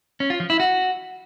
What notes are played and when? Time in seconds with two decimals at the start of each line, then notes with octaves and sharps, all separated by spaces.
0.20 C#4
0.30 F4
0.40 F3
0.50 E4
0.60 F#4